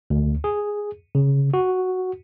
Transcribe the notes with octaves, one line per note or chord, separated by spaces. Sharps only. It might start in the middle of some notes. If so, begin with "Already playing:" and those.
D2
G#4
C#3
F#4